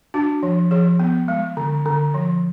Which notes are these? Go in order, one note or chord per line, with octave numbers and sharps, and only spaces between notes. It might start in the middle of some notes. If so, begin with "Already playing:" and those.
D4 F#4
F3
F3 G#4
B3
G#3
D3
D3
F3